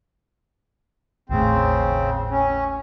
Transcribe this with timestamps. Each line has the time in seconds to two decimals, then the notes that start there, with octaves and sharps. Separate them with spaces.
1.29 G#1 D#2 A2 C#3 C4
2.30 C#4